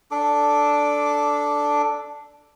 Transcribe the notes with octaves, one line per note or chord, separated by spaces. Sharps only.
D4 A4 D6